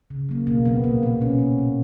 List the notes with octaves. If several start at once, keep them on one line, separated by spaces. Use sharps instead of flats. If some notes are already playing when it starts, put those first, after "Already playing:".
C#3
F#3 A#3
B2 A#3
F#3 A#3 B3
A#2 A#3
F3 A#3 B3
B2 C#4
A#3
A#2